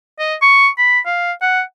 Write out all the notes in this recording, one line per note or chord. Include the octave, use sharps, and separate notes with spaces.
D#5
C#6
B5
F5
F#5